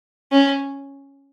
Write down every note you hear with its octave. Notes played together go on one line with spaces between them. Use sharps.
C#4